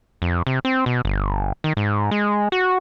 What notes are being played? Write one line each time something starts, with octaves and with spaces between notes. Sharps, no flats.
F2
C3
C4
B2
G1
D#3
G#2
G#3
F#4